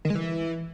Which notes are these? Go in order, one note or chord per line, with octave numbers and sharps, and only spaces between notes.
D#3
G#3
E3